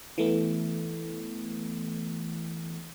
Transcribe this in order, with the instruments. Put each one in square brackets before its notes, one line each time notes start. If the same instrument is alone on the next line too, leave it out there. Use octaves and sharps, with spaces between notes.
[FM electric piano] E3 A3 B3